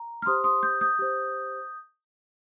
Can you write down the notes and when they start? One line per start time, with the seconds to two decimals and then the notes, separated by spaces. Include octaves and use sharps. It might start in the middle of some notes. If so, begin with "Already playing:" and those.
Already playing: A#5
0.22 F6
0.26 G4 C5 C6 D#6
0.44 C6 D#6
0.63 D#6 G6
0.81 D#6 G6
0.99 G4 C5